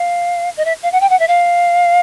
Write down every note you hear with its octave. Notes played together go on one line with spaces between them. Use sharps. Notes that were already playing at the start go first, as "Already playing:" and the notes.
Already playing: F5
D#5
E5
F5
F#5
G5
F#5
E5
F5